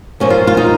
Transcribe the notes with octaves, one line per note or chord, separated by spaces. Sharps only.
A#2 F3 C#4
F4
F4
D#4